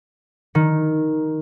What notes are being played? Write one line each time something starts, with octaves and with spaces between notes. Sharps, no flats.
D#3